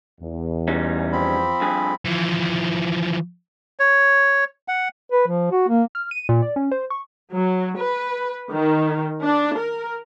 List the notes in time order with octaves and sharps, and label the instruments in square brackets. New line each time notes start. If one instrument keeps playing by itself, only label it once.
[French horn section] E2
[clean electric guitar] G3 C#4 D#4
[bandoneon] F3 C4 B5
[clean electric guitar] G2 G#4
[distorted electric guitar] E3 F3
[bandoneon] C#5
F#5
[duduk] B4
F3
F#4
A#3
[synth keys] F6
D#7
A#2
D5
C#4
C5
C#6
[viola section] F#3
B4
D#3
D4
A#4